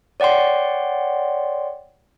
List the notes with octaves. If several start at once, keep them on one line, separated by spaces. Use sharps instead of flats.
C#5 D5 F#5 G5 C6